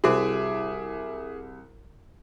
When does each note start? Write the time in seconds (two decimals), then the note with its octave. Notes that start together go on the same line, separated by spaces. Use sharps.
0.04 C2 G3 E4 F#4 G#4 C5 E5 D6